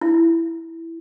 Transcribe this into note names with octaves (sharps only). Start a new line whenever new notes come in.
E4